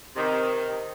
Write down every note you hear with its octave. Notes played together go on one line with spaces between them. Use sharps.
C3 D#3